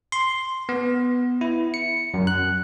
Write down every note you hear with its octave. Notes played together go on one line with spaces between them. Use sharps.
C6
B3
E4
C#7
F#2
F#6